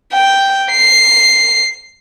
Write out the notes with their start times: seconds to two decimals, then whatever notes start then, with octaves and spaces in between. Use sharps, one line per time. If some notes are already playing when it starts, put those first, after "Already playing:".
0.13 G5
0.71 C7